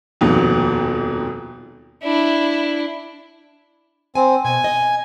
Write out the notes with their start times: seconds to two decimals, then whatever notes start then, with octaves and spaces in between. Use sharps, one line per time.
0.21 D#1 F2 G#2 B2
2.03 D4 E4
4.15 C4 G#5
4.44 B2 G#5
4.64 D#5